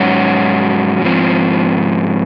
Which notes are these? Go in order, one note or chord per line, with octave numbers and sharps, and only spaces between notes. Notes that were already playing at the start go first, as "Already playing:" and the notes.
Already playing: G#2 F#3 C#4 F#4
G#2 F3 C4